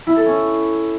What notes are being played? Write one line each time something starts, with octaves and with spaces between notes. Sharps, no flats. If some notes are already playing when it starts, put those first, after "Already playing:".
E4
A4
C#4